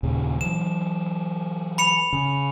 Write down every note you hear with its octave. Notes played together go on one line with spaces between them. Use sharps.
D#2 A#2 C#3
E3 F#3 E7
B5 C#7 F7
C#3